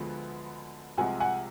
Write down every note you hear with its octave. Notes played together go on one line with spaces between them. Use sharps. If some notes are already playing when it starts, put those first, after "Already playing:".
Already playing: D2 D3 F3 G#3 B3
C2 C3 F3 G#3 F#5 G#5
F#5 G#5